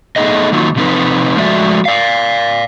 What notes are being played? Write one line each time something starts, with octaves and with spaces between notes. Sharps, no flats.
A3 B3 D#4 G#4 B4 D#5
D#3 F#3 A#3 D#4 F4
C3 F3 C4 D#4 B4
F3 G#3 A3 F#4 D5 E5
D5 F5